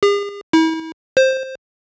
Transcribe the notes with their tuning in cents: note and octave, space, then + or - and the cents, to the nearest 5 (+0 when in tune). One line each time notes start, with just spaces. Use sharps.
G#4 -45
E4 -40
C5 +10